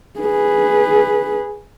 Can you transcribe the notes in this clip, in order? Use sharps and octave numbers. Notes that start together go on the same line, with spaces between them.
G#4 B4